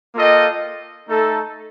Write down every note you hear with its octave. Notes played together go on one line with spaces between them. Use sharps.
A#3 F4 A4 D#5 G5
A3 D#4 A4